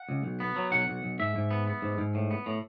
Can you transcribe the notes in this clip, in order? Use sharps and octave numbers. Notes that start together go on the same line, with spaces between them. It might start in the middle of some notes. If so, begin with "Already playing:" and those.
Already playing: F#5
C#2
B1
B3
F#3
B1 F#5
B1
B1
G#2 E5
G#2
B3
B3
G#2
G#2
A2
B3
A2